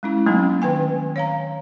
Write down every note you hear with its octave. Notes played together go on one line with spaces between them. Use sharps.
G#3 C#4 E4
F#3 A3 A#3 C4 C#4 D#4
D#3 B4 G5 G#5
C#5 F5 A#5